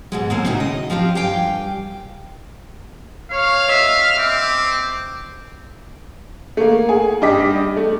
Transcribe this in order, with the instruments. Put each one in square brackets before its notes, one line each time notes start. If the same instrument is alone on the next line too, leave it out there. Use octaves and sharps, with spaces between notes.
[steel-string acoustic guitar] G#2 B2 G#3
D#2 G#3 A#3 C4
A2 C#3 D#4 E4 F#4
D#5
F3 C4 F4 G4
G2 G4 F5 G5 G#5
[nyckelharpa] C#5 [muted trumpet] F5
[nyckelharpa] D#5 E5
[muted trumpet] C4 [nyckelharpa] D6
[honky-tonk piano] A3 A#3
G#4
G2 D4 G4 D#5 D6 B6
A3